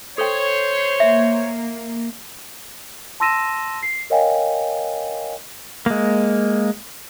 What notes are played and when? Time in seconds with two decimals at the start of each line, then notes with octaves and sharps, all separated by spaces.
0.18 A4 C5 C#5 G5
1.00 A#3 E5
3.20 A5 C6 E6 A#6 D#7 E7
3.83 C7
4.10 A#4 C#5 D#5 F5 G5 G#5
5.86 G#3 A#3